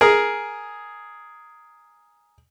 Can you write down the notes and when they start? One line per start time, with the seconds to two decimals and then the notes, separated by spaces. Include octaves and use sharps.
0.01 G#4 A#4